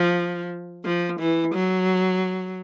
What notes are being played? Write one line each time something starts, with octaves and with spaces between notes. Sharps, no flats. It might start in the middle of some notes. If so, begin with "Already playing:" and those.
Already playing: F3
F3
E3
F#3